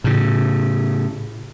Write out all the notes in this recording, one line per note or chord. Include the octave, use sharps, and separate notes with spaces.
A2 C#3